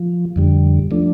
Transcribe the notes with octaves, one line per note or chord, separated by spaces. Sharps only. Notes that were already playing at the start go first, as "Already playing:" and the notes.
Already playing: F3
F2 D3 G3
F3 A3 D4